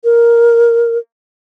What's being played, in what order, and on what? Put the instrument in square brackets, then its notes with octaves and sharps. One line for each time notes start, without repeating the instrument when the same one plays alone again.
[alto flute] A#4